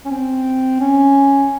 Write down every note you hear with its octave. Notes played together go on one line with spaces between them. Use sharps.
C#4
C4
C#4